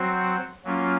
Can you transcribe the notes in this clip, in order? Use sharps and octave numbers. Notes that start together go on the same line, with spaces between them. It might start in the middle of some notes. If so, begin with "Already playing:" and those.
Already playing: F#3 C4 F#4 C5
F#3 A#3 C#4 F4